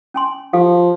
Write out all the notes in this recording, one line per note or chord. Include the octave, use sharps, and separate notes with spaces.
C#4 G#5 C6
F3 G4 A4 F5